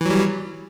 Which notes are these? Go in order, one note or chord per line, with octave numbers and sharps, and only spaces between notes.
E3 F#3 G3